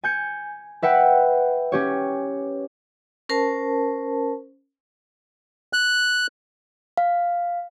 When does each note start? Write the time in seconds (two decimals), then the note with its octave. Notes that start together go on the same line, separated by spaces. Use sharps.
0.04 G#5 G6 C#7
0.82 B4 E5 F#5 G5
1.72 C#4 G4 C#5
3.29 C#4 A#4 C5 A5
5.73 F#6
6.97 F5